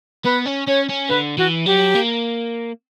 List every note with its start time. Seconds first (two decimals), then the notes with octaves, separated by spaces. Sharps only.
0.25 B3 B4
0.46 C#4
0.67 C#4 C#5
0.89 C#4
1.09 D3 B4
1.38 E3 F#4
1.66 F#3 G4
1.95 A#3